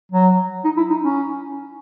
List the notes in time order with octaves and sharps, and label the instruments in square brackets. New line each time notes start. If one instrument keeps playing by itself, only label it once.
[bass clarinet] F#3
D#4
E4
D#4
C#4